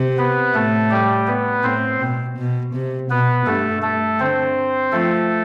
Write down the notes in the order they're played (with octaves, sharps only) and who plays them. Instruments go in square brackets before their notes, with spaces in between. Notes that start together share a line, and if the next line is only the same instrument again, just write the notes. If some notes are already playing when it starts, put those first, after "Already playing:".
Already playing: [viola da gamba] C3
[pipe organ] B3 B4
[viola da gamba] A2 [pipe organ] A3 A4
[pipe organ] G3 G4
B3 B4
[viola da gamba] A2 [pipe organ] C4 C5
[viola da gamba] B2
B2
C3
[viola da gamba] B2 [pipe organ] B3 B4
[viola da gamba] G2 [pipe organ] A3 A4
[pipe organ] A3 A4
[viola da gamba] D3 [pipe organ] C4 C5
[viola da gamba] F3 [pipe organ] A3 A4